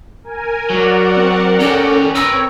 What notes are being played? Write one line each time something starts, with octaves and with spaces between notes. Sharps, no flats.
A#4 G#5
F#3 A#4 D5 F#5
C4
C#4 G4 A4 C#5
C4 A#4 B4 C#5 E6